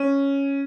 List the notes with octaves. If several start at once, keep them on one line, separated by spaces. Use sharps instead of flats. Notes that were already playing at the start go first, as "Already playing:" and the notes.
Already playing: C#4